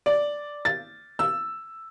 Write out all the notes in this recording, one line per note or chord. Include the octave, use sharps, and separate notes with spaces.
D5
A6
E6